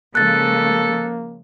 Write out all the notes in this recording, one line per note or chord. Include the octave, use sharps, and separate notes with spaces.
C#3 F3 G#3 A#3 A4 F#6 A6